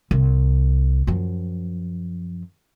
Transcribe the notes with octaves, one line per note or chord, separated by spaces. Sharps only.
C2
F#2 F3